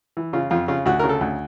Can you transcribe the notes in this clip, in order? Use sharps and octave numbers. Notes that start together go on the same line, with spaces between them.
E3
C#3 F4
F2 F4
C#3 F4
D2 F#4
C#3 A#4
A4
D2